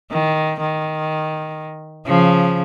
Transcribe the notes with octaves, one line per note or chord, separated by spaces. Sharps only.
D#3
D#3
C#3 F3